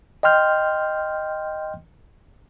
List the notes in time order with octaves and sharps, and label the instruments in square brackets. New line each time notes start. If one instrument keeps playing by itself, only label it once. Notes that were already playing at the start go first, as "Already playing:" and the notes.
[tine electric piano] D#5 G5 C6 F6 G6